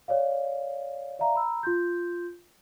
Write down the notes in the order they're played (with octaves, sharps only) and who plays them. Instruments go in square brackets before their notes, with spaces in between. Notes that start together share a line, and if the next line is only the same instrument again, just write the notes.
[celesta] C#5 D5 F5
D5 E5 F5 A#5
A#5 B5 E6
F4 C6 G6